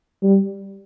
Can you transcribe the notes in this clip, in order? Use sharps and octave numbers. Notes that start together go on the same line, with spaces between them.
G3